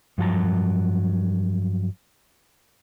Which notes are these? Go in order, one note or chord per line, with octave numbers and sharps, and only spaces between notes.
G2 F3 F#3 A5 A#5